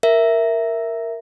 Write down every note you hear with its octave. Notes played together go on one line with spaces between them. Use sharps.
A#4 E5